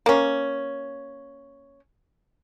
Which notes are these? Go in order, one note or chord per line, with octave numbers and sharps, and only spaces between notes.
A#3 C#4